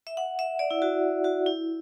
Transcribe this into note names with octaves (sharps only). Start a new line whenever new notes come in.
E5
F#5
E5
D5
E4
F#4
F#4
E4